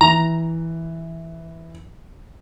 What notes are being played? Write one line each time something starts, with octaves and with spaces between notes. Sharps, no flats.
E3 A#5